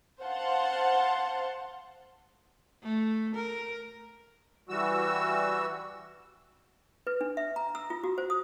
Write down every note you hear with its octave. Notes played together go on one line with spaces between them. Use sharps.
C5 F5 F#5 A5 C6
A3
A#4
E3 G3 F#4 E6
B4
D4
E5
A#5
E6
F4
F#4
C5
D#6